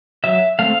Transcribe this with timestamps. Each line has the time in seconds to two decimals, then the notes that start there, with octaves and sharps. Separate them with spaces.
0.24 F#3 E5
0.59 A3 C4 F5